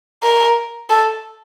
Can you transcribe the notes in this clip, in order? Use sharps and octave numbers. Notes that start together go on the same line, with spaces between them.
A#4
A4